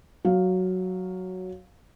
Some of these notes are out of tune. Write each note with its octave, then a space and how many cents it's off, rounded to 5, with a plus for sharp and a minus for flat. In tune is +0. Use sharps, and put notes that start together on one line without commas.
F#3 +0 F5 +10